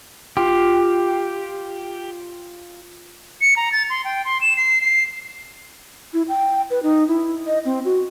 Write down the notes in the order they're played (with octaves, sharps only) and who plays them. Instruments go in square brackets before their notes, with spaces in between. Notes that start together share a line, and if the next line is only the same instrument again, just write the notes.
[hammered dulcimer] F4 [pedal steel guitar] G4
[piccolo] C#7
A#5
A6
C6
G5
C6
E7
C7
C7
[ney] E4
G5
B4
D#4
E4
D#5
C4
F#4